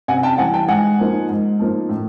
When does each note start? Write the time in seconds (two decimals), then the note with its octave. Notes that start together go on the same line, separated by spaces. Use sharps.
0.08 C3 F#5 G#5
0.23 G5 A5
0.38 E3 G3 F#5 G#5
0.53 G5 A5
0.68 G#2 F#5 G#5
0.99 F3 A#3 D#4
1.29 G#2
1.59 F3 A#3 D#4
1.89 A2